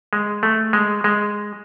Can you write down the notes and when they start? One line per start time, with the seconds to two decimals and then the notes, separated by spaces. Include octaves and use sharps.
0.13 G#3
0.43 A3
0.73 G#3
1.04 G#3